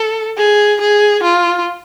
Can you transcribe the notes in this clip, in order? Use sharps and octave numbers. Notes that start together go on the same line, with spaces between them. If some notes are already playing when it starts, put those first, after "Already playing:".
Already playing: A4
G#4
G#4
F4